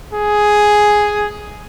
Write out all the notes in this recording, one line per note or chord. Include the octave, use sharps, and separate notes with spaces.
G#4